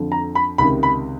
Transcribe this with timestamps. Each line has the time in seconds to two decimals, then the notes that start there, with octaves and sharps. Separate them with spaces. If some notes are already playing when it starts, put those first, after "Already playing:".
Already playing: F2 D3 F3
0.12 A#5
0.35 B5
0.58 C#2 C3 D#3 B5
0.83 B5